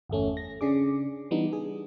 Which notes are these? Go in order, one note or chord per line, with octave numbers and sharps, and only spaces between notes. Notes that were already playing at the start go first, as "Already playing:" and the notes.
G1 E2 A3 C#4
A#6
C#3 D4 G#4 D6
E3 G3 B3 D4 D#4
G#4